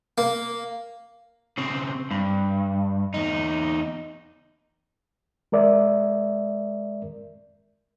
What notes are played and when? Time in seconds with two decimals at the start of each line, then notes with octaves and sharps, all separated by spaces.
0.18 A#3
1.58 C#3 C4
2.11 G2
3.14 E2 D#4
5.52 G#3 A#4 D5 E5